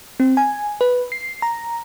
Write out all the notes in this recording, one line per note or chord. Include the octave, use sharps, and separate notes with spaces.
C4
G#5
B4
C7
A#5